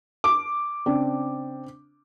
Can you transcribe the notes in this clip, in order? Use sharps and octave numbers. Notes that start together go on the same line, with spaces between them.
D6
C#3 C4 D4